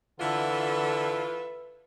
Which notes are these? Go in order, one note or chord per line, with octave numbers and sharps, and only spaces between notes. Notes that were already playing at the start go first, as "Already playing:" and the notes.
D3 E3 F4 A4 B4 E5